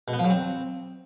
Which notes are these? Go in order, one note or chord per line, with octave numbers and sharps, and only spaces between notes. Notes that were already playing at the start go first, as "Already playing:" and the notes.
B2
B3
F3
F#3
C4